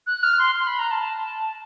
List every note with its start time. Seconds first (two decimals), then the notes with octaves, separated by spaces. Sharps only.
0.07 F#6
0.23 F6
0.39 C6
0.55 C6
0.67 B5
0.79 A#5
0.91 A5